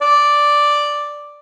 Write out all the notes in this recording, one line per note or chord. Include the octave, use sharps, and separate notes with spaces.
D5